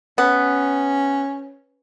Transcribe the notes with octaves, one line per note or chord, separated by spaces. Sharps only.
B3 C#4